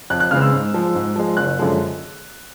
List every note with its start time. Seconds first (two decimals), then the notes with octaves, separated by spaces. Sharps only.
0.10 F2 F#6
0.20 F#6
0.31 C#3 E3 G#3 C4 F6
0.41 E6
0.52 G#2
0.74 F3 G#3
0.95 G#2
1.16 F3 G#3
1.37 F#1 F#6
1.59 F#2 D3 F3 G#3